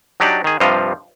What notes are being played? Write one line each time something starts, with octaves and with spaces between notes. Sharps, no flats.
F#3 D4 D#4 G4 D5
D#3 G#4
G2 C3 F3 G3 D#5 F5